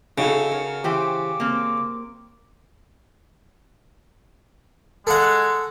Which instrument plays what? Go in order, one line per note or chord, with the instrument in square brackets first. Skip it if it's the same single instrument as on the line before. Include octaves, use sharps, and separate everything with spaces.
[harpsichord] C#3 [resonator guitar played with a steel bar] D#4 F#4 A4 [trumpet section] E4
[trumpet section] F#4 A#4 [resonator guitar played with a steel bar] C#5
[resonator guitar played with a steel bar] E3 G4 C5 [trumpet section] D6
[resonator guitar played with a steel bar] A#3 C4
[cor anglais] G#3 [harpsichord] A4 F#5